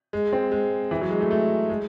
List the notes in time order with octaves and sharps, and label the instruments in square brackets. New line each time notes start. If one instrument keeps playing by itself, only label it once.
[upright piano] G#3
C4
G#3
E3
F#3
G#3
A3
A3
G#3